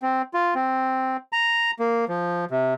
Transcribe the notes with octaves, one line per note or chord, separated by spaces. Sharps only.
C4
F4
C4
A#5
A#3
F3
C3